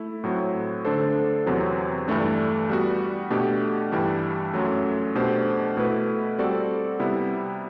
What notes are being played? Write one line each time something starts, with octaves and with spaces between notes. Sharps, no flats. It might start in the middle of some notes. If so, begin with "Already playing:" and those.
Already playing: A3 E4
A2 F#3 C4
D3 A3 D4 A4 C5
E2 C3 F#3 C4
G2 E3 A3 D4
G3 B3 F#4
B2 A3 D4 G4
G2 E3 G3 D4 G4
F#2 F#3 A3
B2 A3 D4 G4 C5
B2 A3 E4 B4
G3 C4 F#4 A4 D5
C3 G3 B3 E4